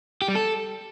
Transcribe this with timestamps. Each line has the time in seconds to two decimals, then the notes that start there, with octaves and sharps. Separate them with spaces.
0.22 G4
0.28 G3
0.35 A4